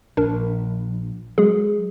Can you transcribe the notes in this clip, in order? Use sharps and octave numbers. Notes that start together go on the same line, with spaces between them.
A#1 D4 A#4
F#3 G#3 G#4